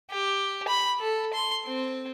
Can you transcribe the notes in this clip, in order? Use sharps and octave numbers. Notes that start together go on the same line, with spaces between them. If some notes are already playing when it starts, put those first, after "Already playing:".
G4
B5
A4
C6
C4